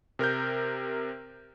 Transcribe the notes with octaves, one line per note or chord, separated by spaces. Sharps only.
C3 A#4 F6 G6